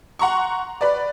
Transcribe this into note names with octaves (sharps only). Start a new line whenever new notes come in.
F#5 A#5 C6 C#6
B4 D5